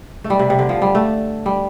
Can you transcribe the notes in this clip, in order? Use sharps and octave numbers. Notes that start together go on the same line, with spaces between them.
A3
G3
C3
C3
D3
F3
G3
A3
G3